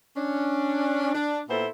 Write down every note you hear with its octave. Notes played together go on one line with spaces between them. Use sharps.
C#4 D4
D4
A#2 B3 E4 A4 C5